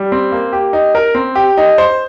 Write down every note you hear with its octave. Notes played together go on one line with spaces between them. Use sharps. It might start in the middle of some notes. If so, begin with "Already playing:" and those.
Already playing: G3
C4
A#3
G4
D#4
A#4
C4
G4
D#4
C5